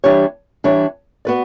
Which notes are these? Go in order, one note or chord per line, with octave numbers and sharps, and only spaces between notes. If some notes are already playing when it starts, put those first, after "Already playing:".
E3 G3 D4 G4 C#5
E3 G3 D4 G4 C#5
B3 F#4 B4 D5